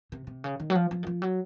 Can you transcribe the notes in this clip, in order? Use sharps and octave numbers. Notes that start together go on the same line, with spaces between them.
C3
C3
C#3
D#3
F#3
F3
F3
D#3
F3
F#3